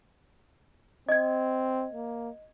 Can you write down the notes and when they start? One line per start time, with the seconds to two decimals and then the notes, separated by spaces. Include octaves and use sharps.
1.09 C4 D#5 G#6
1.93 A#3